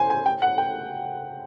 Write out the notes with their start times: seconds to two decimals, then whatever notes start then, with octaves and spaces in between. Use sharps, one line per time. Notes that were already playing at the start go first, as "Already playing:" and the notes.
Already playing: C5 G#5
0.10 G#5
0.26 G5
0.42 F#5
0.58 G5